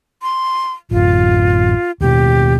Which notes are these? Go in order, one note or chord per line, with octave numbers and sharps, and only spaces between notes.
C6
A1 F#2 F4
D#2 B2 G4